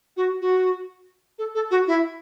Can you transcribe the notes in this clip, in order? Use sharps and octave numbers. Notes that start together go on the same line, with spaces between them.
F#4
F#4
A4
A4
F#4
E4